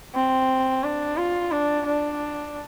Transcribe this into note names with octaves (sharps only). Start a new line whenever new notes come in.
C4
D4
F4
D4
D4